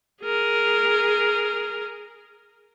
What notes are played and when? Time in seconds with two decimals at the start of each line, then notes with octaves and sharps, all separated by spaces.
0.22 G#4 A#4